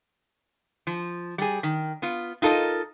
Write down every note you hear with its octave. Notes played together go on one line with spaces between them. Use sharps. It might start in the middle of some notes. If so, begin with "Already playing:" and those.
F3
G3 G#4
D#3
B3 F4
D#4 F4 A4 A#4 D#5